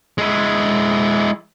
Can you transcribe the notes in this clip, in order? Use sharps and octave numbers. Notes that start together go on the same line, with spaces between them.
G#3 E4